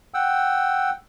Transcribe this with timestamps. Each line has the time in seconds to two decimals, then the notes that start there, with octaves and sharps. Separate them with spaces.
0.14 F#5 G5 E6